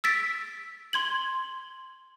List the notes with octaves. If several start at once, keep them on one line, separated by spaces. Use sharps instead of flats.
E6 A6 B6 D7
C6 G#6 F#7